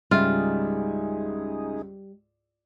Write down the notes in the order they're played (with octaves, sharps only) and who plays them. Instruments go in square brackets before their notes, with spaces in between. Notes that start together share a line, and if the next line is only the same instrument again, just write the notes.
[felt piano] C#2 G#2 E5 [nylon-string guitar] G3 [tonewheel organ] D#4 G#4 [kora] F4